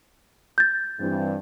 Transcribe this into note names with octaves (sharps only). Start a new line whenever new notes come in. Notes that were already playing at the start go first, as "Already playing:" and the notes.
G6 A6
G2 E3 C4